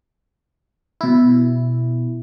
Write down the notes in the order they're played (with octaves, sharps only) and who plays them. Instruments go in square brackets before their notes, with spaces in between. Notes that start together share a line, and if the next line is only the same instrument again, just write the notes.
[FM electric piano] B2 E4